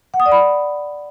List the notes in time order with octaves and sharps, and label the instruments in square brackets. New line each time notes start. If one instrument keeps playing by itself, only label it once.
[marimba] F#5
D#6
D5
B5